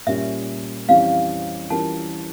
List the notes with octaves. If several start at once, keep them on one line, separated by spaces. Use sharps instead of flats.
A#2 G3 C#4 E5
F2 E3 G3 C#4 F5
E3 G3 C#4 F4 A#4 A5